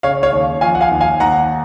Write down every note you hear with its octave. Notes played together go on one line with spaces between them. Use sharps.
C#3 C#5 F5
C#5 F5
D#2
F3 F5 G#5
F#5
F5 G#5
D#2
F5 G#5
D#2 F#5 A#5